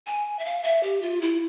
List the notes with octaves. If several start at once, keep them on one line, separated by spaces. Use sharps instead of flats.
G#5
E5
F5
E5
G4
F4
E4